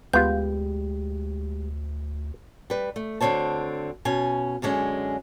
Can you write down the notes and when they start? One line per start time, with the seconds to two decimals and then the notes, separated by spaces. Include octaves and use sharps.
0.13 D2 G#3 B3 F4 G4 G6
2.70 G3 B4
2.96 A3
3.20 D2 D3 F3 C4 C#5 A5
4.05 B2 C#4 G#5
4.62 F#2 D3 G#3 C#4